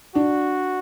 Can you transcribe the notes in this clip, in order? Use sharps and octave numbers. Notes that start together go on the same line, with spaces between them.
D4 F#4